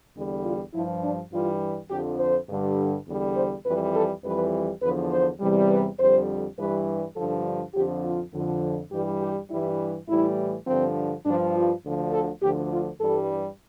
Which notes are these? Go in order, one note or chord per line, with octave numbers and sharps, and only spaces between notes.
E2 D3 G3
F4
G2 F3 E4
D4
G2 E3 G3 F4
F2 D3 F3 G4
C5
G2 D3 G3
E2 D3 G3
C5
F2 E3 G3 B4
A4
F2 E3 G3 B4
E2 D3 F3 B4
C5
E2 C3 E3 G3
B4
F2 D3 G3 C5
G2 E3 G3 B4
G2 D3 F3 A4
F2 D3 F3 G4
F4
F2 D3 F3
G2 E3 G3 G4
G4
G2 E3 G3 E4
A2 E3 G3 E4
G2 D3 F3 C4
G2 F3 D4
F4
D2 D3 F3
A4
D2 D3 F3 G4
F4
G2 E3 G3 A4